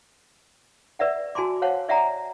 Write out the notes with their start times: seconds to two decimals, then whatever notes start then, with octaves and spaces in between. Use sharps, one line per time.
0.99 B4 D5 E5 F#5
1.35 F#4 G#5 A5 C6 D6
1.62 C5 C#5 F5 F#5 A5
1.89 D5 E5 F#5 G#5 A#5